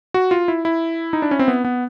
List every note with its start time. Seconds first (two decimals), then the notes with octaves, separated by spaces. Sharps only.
0.14 F#4
0.31 F4
0.48 E4
0.65 E4
1.13 D#4
1.22 D4
1.31 C#4
1.39 C4
1.48 B3
1.64 B3